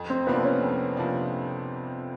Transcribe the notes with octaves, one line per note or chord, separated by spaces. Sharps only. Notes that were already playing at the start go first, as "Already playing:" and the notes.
Already playing: F2
C4
C3 F3 A#3 B3 D4
C#4
F2
C3 F3 A#3 D4